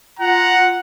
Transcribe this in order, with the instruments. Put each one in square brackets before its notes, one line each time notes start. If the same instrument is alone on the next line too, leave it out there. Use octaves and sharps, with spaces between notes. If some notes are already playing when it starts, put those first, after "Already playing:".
[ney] F4 [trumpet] F#5 [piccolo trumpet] A#5